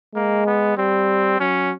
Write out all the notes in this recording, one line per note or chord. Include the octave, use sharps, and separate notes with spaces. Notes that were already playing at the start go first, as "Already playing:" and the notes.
G#3 A#3
B3
G3 C4
F#3 C#4